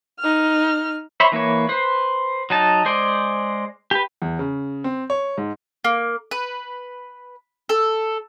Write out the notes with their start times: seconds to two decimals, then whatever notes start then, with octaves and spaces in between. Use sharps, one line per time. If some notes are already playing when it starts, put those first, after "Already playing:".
0.20 D#4 F6
1.20 C5 C#5 E5 B5
1.32 E3 A#3 E4 C#5
1.69 B4 C5
2.50 F#3 D#4 A5
2.85 G#3 G#4 C5 D5
3.91 G4 B4
4.22 E2
4.39 C#3
4.84 C4
5.10 C#5
5.37 G#2
5.84 A#3
6.31 B4
7.69 A4